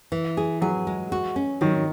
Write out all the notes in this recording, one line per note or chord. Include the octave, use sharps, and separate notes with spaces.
E3
G#4
F#3 G#4
G#3
F#4
C#4
D#3 F#3